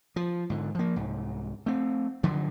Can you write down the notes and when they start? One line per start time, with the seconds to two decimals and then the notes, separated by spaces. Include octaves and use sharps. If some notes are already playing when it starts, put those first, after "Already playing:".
0.16 F3
0.50 G#2 D3
0.75 F3 A#3
0.96 C2 G#2
1.66 A3 C4
2.23 G2 D3 F3 F#3